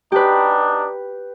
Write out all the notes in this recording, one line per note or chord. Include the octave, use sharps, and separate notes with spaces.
B3 D4 D#4 G4 B4